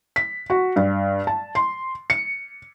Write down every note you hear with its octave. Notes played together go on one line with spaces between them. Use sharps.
B6
F#4
G2
A5
C6
C#7